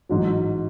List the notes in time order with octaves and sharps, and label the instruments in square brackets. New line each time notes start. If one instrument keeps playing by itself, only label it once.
[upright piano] A1 G#2 F#3